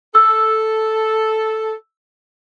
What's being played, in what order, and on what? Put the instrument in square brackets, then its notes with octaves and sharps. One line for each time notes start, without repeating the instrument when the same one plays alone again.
[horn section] A4 [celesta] E6